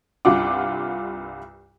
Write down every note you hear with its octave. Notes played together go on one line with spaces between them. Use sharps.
C2 G2 F4 F#5 D6